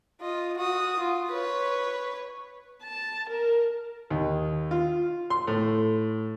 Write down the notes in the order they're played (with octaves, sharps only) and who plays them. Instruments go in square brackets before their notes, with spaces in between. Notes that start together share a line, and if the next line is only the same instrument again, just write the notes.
[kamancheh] F4 D#5
F#4 D#6
F4
B4 C#5
[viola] A5
A#4
[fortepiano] D#2
F4
C6
A2